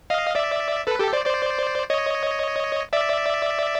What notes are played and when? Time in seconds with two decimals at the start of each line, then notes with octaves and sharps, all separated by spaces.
0.10 D#5 F5
0.35 D5 E5
0.87 A4 B4
0.99 G4 A4
1.13 C5 D5
1.26 C5 D5
1.90 C#5 D#5
2.93 D5 E5